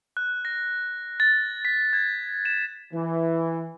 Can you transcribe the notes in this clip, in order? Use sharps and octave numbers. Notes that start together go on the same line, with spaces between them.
F#6
A#6
A6
B6
G#6
E7
E3